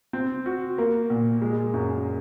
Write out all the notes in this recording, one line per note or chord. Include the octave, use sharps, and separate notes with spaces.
C4
F#4
A#3
A#2
G#3
F#2